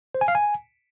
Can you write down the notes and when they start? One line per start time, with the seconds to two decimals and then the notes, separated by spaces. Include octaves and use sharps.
0.15 C5
0.21 G#5
0.28 F5
0.35 G#5